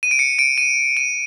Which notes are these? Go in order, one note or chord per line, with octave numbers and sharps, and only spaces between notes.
D#7
D7
C#7
D7
D#7
D#7